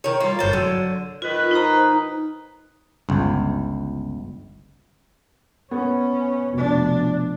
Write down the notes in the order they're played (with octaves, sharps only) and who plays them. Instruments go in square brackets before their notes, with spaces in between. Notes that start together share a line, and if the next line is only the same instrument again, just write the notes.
[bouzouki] D#3 C#5
[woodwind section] G3 F4 [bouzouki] A#3
[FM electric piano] G1 A6 [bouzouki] A2 C5 [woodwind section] C#5
[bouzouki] D3 [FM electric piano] F#3
[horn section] G#2 D#3 B4 [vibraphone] F4
[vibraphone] D#4 C5 A#5
[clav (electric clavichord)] G1 C#2
[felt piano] B3 [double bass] C#4
[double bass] F1 D4 [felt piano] B2